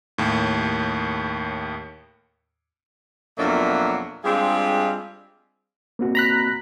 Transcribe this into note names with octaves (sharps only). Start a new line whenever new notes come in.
D#2 A2
F2 B2 F#3 A#3 D4 E5
G3 G#3 C4 D4 F4 G#4
A#3 C4 F#4
A#5 B5 F#6